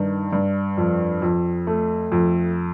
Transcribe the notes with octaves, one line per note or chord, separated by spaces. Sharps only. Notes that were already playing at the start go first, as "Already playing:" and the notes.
Already playing: G2 D#3
G2
F2
F2
A3
F2